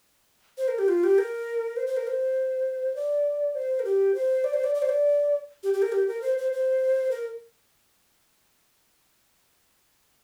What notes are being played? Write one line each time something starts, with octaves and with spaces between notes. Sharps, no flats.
C5
A#4
G4
F4
G4
A#4
C5
C5
A#4
C5
D5
C5
A#4
G4
C5
D5
C5
D5
D5
C5
D5
G4
G4
A#4
G4
A#4
C5
C5
C5
A#4